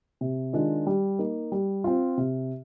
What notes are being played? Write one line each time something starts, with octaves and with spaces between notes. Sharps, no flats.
C3
D#3 G#3 D4 F4
G3
A#3 D#4
G3
C4 F4
C3